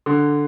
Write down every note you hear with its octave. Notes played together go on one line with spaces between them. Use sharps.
D3